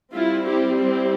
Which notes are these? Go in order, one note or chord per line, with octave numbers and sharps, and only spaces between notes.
G3 C4 E4 F4
E4 G4
E4 G4